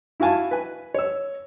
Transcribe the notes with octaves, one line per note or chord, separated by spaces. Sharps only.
E4 F#4 F5 G#5 A5
B4 G#5
C#5 E6